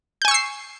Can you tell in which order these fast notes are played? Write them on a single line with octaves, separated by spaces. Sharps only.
G6 G#5 C#6 E6 C7